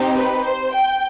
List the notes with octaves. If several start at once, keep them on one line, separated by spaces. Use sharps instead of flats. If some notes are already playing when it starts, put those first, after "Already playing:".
Already playing: C4 D#4 G4
B4
C5
G5